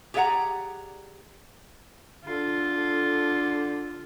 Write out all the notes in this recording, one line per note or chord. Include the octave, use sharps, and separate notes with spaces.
G4 G#4 D5 E5 F#5 A#5
D3 F4 A4